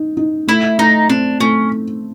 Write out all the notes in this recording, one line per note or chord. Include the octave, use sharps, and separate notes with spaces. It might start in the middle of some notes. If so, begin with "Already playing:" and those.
Already playing: D#4
D#4
A3 E4
A3 D#4
C4 D4
A3 C#4